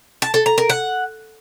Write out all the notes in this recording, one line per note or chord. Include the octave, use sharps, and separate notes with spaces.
A5
A4
A#5
A#4
F#5